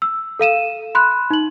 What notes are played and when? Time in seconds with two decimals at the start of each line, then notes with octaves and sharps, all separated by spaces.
0.02 E6
0.39 A4 F5 D#7 E7
0.95 B5 C6 F#6
1.30 D#4 F#7